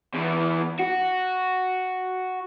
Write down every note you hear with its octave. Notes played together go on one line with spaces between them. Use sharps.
E2 E3
F#4